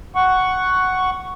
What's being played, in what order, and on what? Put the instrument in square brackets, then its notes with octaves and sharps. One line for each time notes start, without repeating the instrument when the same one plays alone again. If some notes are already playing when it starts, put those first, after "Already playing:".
[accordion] F#5 C#6